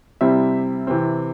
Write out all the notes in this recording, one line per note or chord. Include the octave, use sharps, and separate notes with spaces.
C3 G3 C4 E4 E5
C3 E3 C4